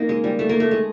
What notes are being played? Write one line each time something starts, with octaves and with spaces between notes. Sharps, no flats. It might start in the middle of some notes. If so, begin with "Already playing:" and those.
Already playing: A#3 C#4 D#4
G#3
G3
A3
A#3
A3
G#3